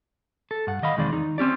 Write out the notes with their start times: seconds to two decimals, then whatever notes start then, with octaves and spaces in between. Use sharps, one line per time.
0.51 A4
0.67 G2 F#5
0.82 D#3 D#5 F5 B5
0.97 B1 E2 D#3 G#3 C4 D5
1.13 D#3 D#4
1.38 C4 C#4 G4 D5